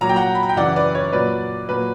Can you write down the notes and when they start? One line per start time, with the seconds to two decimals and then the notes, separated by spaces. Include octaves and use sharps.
0.01 A#2 F#3 A#5
0.09 G5
0.16 F#5 A#5
0.35 B5
0.43 A#5
0.49 G5
0.57 F#2 C#3 E3 D5 F#5
0.76 B4 D5
0.95 C#5
1.13 A#2 F#3 B4 D5
1.69 A#2 F#3 B4